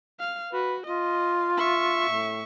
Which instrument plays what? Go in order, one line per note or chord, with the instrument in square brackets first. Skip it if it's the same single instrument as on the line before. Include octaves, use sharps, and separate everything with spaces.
[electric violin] F5
[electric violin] F#4 [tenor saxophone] B4
[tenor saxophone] F4 [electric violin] D#5
[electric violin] E5 C#6
[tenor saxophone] A2